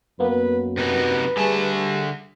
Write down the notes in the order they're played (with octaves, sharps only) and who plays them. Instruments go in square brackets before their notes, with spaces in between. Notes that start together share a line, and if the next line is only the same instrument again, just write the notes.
[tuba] F#2 [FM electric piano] A#3 B3 [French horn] B4
[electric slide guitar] C3 D#4 F#4 [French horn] B4
[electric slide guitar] D3 E5 A5 [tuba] G3 [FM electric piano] G#4